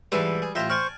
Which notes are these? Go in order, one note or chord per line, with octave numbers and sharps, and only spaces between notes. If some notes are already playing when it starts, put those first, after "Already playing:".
G#2 B2 E3 G3 B4 E5 C6
G#4
A1 F4 C5 E5 G5 A5 A#5
C5 D5 G#5 C#6 F6